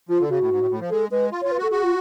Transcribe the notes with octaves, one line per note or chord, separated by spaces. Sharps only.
F3 F4
D3
C#3 F#4
A2
G#2
A2
A2
F3
G#3 A4
G#3 B4
F4
C#5
F4
B4
F#4 A4
F#4 G#4
F4